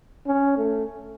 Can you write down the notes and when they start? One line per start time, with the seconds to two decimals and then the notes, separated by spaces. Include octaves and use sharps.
0.26 C#4
0.57 A3